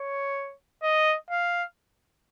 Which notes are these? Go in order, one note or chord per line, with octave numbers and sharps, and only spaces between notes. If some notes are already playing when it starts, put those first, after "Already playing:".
Already playing: C#5
D#5
F5